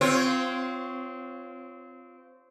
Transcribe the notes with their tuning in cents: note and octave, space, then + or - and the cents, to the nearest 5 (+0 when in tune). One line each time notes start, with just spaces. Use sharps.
C4 -20 F4 +0 C#5 +0